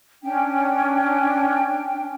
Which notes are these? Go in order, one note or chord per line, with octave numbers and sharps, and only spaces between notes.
C#4 D4 G5